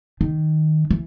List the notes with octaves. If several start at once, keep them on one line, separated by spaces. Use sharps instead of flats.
D#3
E3